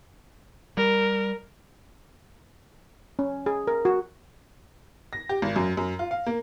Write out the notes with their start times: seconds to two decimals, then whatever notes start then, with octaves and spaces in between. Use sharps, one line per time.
0.77 G3 A#4
3.19 C#4
3.46 G#4
3.67 A#4
3.85 F#4
5.13 A#6
5.29 G4
5.42 G#1
5.56 F#2
5.77 F#2
5.99 F4
6.11 F5
6.26 A#3